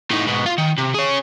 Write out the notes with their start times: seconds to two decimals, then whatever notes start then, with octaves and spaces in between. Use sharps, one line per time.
0.11 A2 D#4
0.26 G#2 B2
0.46 F4 F5
0.58 D#3
0.78 C3
0.95 G#4 C#5